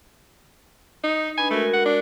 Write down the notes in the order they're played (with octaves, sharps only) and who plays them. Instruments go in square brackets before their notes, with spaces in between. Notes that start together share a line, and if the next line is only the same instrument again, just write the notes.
[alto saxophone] D#4
[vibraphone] D4 B4 B5 [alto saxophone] G#5
[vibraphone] G#3 F#4 A#4 [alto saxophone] A3
[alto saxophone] F#5
D4